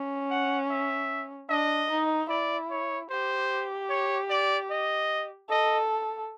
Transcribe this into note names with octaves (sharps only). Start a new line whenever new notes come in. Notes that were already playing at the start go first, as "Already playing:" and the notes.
Already playing: C#4
F#5
E5
D4 D#5
D#4
E4 D5
C#5
G4 C5
C#5
D5
D#5
A4 D#5